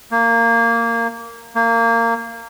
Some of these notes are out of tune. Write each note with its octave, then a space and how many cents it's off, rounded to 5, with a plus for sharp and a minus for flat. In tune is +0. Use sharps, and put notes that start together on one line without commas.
A#3 -15
A#3 -20